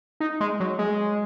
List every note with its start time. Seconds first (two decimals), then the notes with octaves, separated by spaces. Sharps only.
0.20 D#4
0.40 G#3
0.60 F#3
0.79 G#3